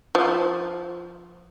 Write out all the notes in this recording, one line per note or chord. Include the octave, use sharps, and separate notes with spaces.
F3